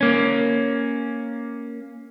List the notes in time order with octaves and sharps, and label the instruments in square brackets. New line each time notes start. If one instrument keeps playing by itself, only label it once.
[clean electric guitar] A#3 C#4